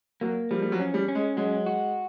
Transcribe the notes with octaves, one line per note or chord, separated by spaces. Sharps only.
F#3 A#3
F3 G3
G3
F#3
C#4
G3
C#4
G#3
F#3 G#3
F#4